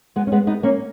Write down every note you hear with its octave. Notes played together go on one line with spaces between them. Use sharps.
G#3 B3
C#4
G#3 B3
B3 D#4
A#3 C#4